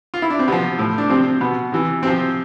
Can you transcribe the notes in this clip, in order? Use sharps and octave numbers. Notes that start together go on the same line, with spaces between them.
F4
E4
D4
C4
C3 F3 B3
A2 F3
D4
C3 F3 C4
B2 B3
C3 E3
C3 F3 C4